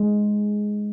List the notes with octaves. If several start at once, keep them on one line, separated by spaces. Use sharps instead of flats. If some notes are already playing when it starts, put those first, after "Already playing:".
Already playing: G#3